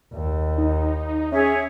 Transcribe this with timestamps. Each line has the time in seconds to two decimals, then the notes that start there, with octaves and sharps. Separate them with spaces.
0.13 D#2
0.58 D#4
1.32 C#4 G#4 C#5 E5